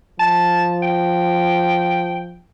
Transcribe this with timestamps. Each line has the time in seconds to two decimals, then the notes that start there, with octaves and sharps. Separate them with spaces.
0.19 F3 A5
0.83 G5